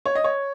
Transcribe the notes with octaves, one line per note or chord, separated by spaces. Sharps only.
C#5
D#5
C#5